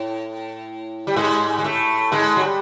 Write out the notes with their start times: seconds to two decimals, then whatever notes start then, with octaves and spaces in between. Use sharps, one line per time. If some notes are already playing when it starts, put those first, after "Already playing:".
Already playing: A2
1.07 G3
1.16 G#2 G#3
1.59 G#3
1.64 A2 A3
2.12 G#2 G#3
2.36 F#3
2.43 G3